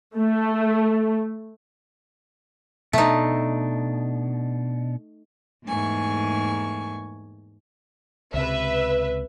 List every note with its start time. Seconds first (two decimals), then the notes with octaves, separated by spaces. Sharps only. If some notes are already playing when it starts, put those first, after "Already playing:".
0.16 A3
2.93 B2 A3 D4 D#4
5.66 E2 G#2 A3 A#3 G#5 C#6
8.34 C#2 C3 B4 E5